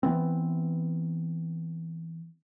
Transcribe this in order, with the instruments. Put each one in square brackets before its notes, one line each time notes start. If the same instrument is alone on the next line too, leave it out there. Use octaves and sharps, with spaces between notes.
[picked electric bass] E3 B3 C4